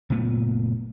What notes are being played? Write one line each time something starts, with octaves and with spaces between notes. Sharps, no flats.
F#1 A#2 A3 B3